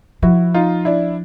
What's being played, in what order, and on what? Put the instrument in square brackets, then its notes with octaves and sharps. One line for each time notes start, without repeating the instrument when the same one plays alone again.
[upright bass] F3 [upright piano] E4 F#4
[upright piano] D#4 F4
D4 E4